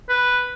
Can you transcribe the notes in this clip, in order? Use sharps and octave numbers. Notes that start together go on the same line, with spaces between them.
B4